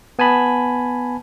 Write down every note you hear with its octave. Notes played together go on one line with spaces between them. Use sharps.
B3 G#5 A5 B5